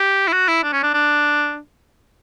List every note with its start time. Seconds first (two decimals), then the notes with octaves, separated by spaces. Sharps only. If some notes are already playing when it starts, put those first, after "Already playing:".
Already playing: G4
0.28 E4
0.33 F#4
0.48 E4
0.64 D4
0.73 C#4
0.83 D4
0.94 D4